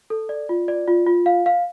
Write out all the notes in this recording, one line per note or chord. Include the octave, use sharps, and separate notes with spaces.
A4
D5
F4
D5
F4
F4
F5
F5